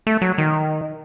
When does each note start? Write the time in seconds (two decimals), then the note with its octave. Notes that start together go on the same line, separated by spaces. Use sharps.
0.07 A3
0.22 F#3
0.38 D#3